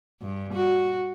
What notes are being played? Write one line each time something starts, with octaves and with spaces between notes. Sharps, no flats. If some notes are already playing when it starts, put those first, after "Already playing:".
G2
F#4